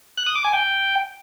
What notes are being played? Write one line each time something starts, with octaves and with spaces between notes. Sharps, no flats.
F#6
D#6
D6
G#5
G5